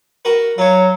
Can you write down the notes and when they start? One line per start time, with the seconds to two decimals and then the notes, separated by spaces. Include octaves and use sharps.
0.25 F#4 A#4 B4
0.58 F#3 F4 C#5